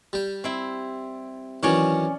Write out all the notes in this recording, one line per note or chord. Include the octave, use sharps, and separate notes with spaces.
G3 G5
C4 E4
D#3 E3 F#3 C#4 C#5 D5